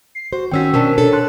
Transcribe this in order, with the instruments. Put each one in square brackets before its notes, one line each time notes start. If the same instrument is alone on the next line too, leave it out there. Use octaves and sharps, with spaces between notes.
[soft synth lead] C7
[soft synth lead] F#4 [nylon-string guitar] C5
[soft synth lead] D#3 [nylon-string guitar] C4 C#4 F#4 [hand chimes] G5 E6 B6
[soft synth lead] B2 [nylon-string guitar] C#4 D4 [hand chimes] A#4 C5 A5
[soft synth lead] D4 [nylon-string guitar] A4 [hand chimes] C#5
[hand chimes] A5 C6 F#6